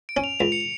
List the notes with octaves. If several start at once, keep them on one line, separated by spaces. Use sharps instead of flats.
D7
C#4
F7
C#2 F7
C#7